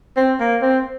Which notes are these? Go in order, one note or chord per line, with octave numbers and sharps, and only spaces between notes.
C4
A#3
C4